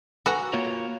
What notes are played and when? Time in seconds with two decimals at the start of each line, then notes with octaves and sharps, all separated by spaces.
0.26 F#4 A4 B4 G#5 A#5
0.53 A#3 F4 C#5